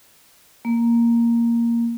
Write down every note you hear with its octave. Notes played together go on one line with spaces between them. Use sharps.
A#3